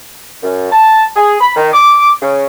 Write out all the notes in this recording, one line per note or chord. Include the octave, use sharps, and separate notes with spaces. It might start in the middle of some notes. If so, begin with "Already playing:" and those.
F#2
A5
G#4
B5
D#3
D6
C#3